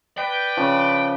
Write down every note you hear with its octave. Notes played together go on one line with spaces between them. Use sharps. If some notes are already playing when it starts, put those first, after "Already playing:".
B4 D5 G5
C#3 F3